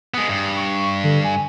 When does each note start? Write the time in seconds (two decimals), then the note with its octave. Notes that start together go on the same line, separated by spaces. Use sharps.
0.14 G#3 B3 D#6
0.29 G2
0.56 C#6
1.04 D3
1.24 G#5